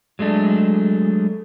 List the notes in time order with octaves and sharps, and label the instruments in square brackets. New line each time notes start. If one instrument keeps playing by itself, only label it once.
[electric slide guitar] F#3 G#3 A3 D4